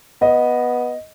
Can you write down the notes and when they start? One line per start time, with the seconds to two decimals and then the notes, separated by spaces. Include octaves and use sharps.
0.22 B3 D#5